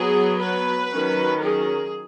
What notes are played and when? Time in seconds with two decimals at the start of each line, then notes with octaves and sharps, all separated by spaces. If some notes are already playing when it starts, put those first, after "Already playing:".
Already playing: F#3 B3 G#4
0.40 B4
0.91 D#3 F#3 C#4
1.43 G#4